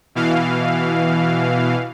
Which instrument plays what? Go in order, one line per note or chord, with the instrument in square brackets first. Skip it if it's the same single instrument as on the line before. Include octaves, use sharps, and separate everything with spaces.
[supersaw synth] B2 E3 F5